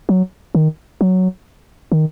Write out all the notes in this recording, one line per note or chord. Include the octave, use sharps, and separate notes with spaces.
F#3
D#3
F#3
D#3